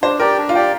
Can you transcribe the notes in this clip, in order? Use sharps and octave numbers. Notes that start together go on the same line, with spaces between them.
D4 C5
G4 A#4 D5 G5
D4
F4
G4 D5 G5